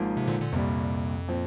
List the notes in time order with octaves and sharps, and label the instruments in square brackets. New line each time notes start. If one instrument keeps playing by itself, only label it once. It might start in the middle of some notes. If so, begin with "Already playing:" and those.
Already playing: [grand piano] G#1 G#2 F3 A#3
[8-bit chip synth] C3
A#2 D3
A#2 D3
[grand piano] C2 A#2 G3 [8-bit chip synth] F2
[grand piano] A#2 F3 C4